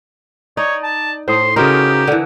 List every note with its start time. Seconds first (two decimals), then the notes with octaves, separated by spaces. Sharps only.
0.57 D#4 C#5 D5
0.83 A5
1.28 A2 C5 C6 D#6
1.56 C#3 D#4 F#4 G4 A#4 C5 A#5
2.07 D3 E3